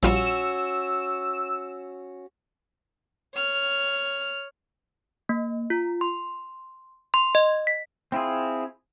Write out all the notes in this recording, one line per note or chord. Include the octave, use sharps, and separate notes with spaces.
A#1 G3 C#4 F4 F#4 E6
C#5 F6
A#3
F4
C6
C6
D#5
B6
C4 E4 F4 G#4